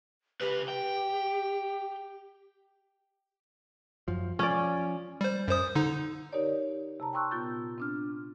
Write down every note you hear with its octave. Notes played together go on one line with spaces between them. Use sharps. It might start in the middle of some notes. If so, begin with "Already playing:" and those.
C#3 G4 B4
G5
F#2 F3
F3 C#4 D5
G3 C5
F#2 C5 D#6
D3 D#4
D#4 G4 A#4 C#5 D5
C3 A5 A#5
G5 A5 C6 C#6 E6 F#6
A#2 B3 F4 G6 A6
C4 D4 F6